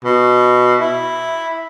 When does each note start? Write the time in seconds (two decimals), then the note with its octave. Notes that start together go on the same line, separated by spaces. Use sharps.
0.04 B2
0.80 E4